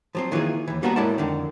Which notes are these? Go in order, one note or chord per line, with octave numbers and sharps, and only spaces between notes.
F3 F#3 C4
D#3 E3 A#3 F4 G#4
D#2 E3
G3 A#3 B3 F#4 A5 A#5
A2 G#3 E4 A#4 D5 A5
F2 D3 D#3